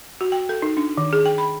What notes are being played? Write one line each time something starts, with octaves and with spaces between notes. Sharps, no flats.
F#4
G5
A4
D#4
D4
D#3
G#4
G5
B5